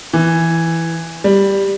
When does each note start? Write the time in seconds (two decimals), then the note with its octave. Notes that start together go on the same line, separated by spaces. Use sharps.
0.13 E3
1.24 G3